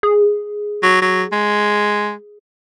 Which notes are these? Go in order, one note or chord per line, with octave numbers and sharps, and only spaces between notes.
G#4
F#3
F#3
G#3